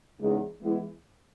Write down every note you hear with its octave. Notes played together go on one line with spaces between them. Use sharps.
E2 C#3 G#3 B3 D#4
E3 G#3 B3 E4